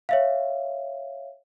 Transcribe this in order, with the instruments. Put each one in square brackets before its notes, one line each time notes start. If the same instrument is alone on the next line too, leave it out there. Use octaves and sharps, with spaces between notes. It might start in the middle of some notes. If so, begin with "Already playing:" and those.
[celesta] C#5 E5 F5